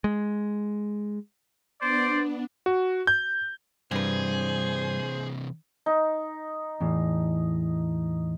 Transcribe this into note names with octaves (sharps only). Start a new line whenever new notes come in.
G#3
B3 D4 C5 D5
F#4
G6
G2 C3 E3 G#4 B4 C5
D#4
E2 A2